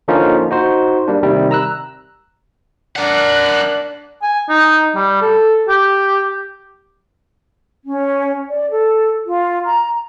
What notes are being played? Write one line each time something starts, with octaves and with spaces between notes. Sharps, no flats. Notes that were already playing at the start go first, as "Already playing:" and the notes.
D3 F3 A#3 C#4 D#4 F4
D#4 F#4 C5
G3 A#3 D4
C3 D#3 G3
A#5 E6 F#6
D4 A#4 F#5 F#6
G#5
D#4
G3
A4
G4
C#4
D5
A4
F4
A#5